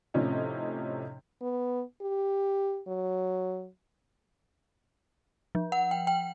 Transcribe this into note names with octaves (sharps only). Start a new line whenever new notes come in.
A2 C3 F3 C#4 D#4
B3
G4
F#3
F3
F#5
G5
G5